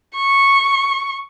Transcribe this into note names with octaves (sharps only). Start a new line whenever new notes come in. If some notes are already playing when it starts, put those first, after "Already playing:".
C#6